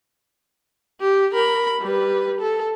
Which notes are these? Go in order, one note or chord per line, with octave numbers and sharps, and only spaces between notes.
G4
A#4 B5
G3 B4
A4